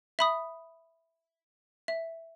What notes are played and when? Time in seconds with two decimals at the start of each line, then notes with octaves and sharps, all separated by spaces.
0.19 E5 B5 D#6
1.88 E5